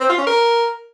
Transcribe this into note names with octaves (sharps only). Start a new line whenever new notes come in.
C4
F4
C#4
A#4